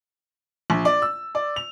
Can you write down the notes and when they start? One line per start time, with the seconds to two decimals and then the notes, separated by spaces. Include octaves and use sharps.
0.70 A#1
0.85 D5
1.02 E6
1.35 D5
1.56 F7